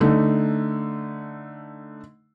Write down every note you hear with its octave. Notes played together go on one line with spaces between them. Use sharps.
D3 A3 D#4